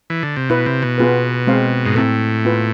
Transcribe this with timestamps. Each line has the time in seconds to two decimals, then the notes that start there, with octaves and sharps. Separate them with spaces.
0.10 E3
0.23 D3
0.36 C3
0.50 B2 E4 B4 E5
0.66 C3
0.82 B2
0.98 B3 F4 G#4 B4
1.47 G#3 C4 G#4 C5 F5
1.86 G#2
1.95 A2 C4 E4 A4
2.45 B3 F4 B4